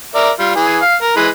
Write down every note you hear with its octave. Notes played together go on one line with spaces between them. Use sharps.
A#4 D5 E5
G3 F4
E3 G#4
F5
A#4
E3 G#3 B4